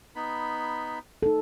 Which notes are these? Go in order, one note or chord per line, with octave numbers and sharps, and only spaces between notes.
B3 D#4 B5
D#4 A4